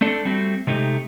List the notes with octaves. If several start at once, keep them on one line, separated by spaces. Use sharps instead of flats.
A3 C4 D4 A4
G3 A3 C4 F#4
C3 G#3 A3 D#4 G4